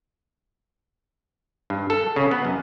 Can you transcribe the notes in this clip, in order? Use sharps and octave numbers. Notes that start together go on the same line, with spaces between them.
G2
A4
C#3
B3
F#2